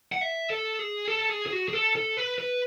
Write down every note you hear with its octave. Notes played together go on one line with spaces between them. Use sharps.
F#5
E5
A4
G#4
A4
G#4
G#4
F#4
G#4
A4
A4
B4
B4